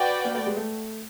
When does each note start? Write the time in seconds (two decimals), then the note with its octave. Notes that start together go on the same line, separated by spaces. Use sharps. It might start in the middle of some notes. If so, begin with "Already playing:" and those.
Already playing: F#4 B4 D5 G5
0.25 A#3
0.35 A3
0.47 G#3
0.57 A3